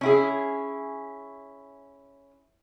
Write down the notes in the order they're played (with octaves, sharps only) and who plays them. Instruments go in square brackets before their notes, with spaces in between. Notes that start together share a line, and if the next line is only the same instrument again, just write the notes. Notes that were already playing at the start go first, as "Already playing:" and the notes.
[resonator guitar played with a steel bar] C#4 E4 G#4